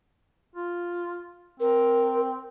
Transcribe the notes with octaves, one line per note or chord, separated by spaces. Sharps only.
F4
C4 A#4